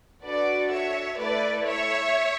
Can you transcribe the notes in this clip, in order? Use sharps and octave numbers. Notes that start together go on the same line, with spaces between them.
D4 F#4 A4 B4 D5
C#5 E5
A3 E4 A4 B4 D5
C#5 E5